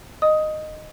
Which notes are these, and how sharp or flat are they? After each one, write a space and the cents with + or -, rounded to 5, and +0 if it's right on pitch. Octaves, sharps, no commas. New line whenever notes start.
D#5 -10 D#6 +10